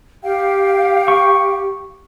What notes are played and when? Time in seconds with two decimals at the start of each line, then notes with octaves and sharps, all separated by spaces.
0.24 G4 F5 G5
1.08 C#6